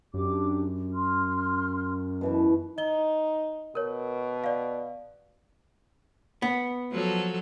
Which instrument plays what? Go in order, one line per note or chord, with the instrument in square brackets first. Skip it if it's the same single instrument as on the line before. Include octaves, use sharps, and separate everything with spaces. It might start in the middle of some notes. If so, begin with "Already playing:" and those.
[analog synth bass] F#2 [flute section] D4 G4 D6
[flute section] C6 F6
[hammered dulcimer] B2 E3 A5
[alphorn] D#4 [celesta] D#5 G7
[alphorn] B2 [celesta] A#4 C#5
[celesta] D5 F5
[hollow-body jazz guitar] B3
[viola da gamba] F3 F#3 A4